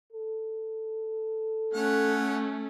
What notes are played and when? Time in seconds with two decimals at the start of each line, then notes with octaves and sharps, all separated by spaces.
0.13 A4
1.74 A3 C#4 C#5 F#5